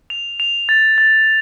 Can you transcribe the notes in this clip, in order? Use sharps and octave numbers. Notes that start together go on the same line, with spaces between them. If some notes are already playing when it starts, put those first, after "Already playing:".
F7
F7
A6
A6